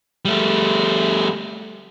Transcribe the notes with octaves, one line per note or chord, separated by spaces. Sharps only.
G3 A3